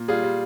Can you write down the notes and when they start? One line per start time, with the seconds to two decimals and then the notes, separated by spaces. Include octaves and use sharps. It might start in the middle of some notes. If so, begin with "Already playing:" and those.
Already playing: A#2
0.08 G3 F4 G#4
0.23 G3